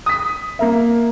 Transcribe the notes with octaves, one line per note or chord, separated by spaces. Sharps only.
D#6 B6
A#3 A#4 E5